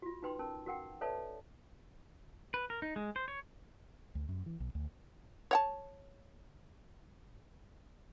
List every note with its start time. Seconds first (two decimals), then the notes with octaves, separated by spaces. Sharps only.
0.02 F4 F#4
0.23 D#4 F#4 B4 G5 C6
0.39 C#4 A#4 A5
0.66 F#4 A#4 F#5 G5
1.01 A4 B4 C#5 D5 E5 A5
2.54 B4
2.70 A#4
2.82 D#4
2.96 G#3
3.16 C5
3.28 C#5
4.15 D2
4.29 F#2
4.46 E3
4.60 B1
4.75 D2
5.51 C#5 F#5 A5